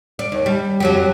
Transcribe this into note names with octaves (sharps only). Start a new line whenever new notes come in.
D5
D#2
G3
F2 F#3 G4